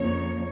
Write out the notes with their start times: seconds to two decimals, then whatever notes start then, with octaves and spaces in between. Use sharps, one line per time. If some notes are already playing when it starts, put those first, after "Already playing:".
Already playing: F2 C#3 F3 A#3 C#5